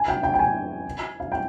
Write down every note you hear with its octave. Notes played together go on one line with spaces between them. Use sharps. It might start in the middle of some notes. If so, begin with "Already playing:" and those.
Already playing: G#5
G5
G5
G5
G#5
F5
G5